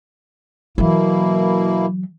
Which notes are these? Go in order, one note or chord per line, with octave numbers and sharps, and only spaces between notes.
B2 E3 F#3 A#3 E4